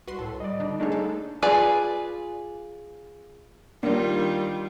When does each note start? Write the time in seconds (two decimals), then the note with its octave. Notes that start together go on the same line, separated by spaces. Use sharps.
0.08 C2 F#4 B4 C6
0.19 A2 A4
0.40 G3 D5 D#5
0.60 D3 D4 D#4
0.80 A3 A#3 D4 D#4 G#4 C#5
0.92 A4
1.42 F4 G#4 B4 D5
3.83 D#3 G3 A#3 D4 F4